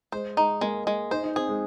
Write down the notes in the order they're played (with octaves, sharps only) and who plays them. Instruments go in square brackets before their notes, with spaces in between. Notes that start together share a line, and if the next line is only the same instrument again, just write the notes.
[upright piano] G#3 [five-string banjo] C5
[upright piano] G#3 [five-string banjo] D#4
[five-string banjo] G#3 [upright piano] A#3
[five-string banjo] G#3
[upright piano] D#4 [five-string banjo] C5
[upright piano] D#4
[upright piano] C4 [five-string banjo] G#4
[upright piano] G#3